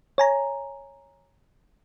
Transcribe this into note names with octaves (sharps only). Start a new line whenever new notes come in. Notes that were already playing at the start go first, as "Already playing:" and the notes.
C#5 G#5 A#5